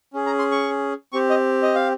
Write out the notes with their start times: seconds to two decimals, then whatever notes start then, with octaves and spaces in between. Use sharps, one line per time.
0.13 C#4 G#4
0.26 A#5
0.39 C6
0.51 C#6
1.13 C4 G4 C#6
1.30 D#5
1.63 D#5
1.75 F5